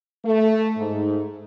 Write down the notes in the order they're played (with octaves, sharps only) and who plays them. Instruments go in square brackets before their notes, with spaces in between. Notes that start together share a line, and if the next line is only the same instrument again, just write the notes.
[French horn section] A3
G#2